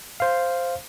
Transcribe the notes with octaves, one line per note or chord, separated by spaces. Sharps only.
C5 F5